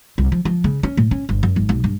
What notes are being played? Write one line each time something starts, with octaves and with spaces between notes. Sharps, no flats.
C2
F3
F3
C#3
C#4
A2
C#4
G1
F#2
G#1
B1
G2